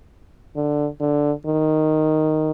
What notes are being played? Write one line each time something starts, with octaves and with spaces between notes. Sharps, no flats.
D3
D3
D#3